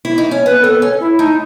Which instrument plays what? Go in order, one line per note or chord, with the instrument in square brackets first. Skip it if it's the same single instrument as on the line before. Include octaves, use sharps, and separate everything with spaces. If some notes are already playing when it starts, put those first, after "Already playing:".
[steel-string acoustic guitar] E4
D#4
C#4
[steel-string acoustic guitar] B3 [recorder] B4
[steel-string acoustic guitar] B3 [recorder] A4
[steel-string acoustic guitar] C#4
[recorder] E4
[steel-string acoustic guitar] A3 [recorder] D#4